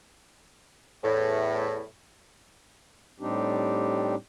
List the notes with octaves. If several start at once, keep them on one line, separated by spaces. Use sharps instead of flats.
E2 A2
A2 G3 C4 D4 D#4 G4